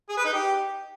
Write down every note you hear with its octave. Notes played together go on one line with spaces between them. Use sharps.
G#4
B4
D#4
G4